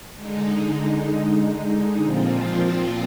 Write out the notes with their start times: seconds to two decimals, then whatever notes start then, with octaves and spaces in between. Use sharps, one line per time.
0.14 D3 G#3 D#4
2.02 A#2 F3 C4 F4